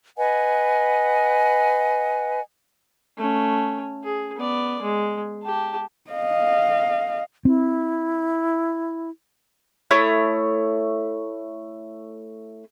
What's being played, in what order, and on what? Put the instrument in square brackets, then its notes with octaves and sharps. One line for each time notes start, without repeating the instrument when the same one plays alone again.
[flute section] B4 D#5 F#5 G#5
[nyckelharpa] A3 C#4
G#4
B3 D5
G#3
G4 A5
[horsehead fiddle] D#5 F5
[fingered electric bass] C4 [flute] E4
[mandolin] A3 E4 C#5 D#6